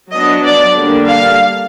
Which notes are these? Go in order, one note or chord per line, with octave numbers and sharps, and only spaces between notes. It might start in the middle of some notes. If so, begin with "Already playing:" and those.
F#3 B3 D4 D#5
D5
D3 G3 A#3 D4
F5